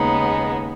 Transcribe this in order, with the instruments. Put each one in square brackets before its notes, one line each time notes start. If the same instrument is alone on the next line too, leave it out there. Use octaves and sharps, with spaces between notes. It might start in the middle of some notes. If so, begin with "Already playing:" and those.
Already playing: [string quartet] D#2 C#3 G#3 B3 D#4